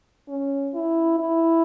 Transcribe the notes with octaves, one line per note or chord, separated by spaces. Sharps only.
C#4
E4
E4